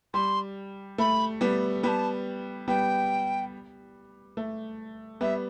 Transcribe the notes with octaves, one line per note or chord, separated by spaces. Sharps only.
G3 C6
A3 B5
G3 B3
G3 B3 A5 B5
G3 B3 G5
A3
G3 B3 E5